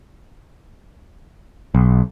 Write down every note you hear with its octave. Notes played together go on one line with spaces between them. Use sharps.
B1